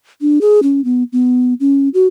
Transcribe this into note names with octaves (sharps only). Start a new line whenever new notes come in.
D4
G#4
C#4
B3
B3
C#4
F#4